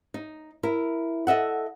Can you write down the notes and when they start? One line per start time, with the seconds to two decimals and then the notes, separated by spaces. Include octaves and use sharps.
0.14 D#4
0.63 E4 A#4
1.27 A4 D#5 E5 F#5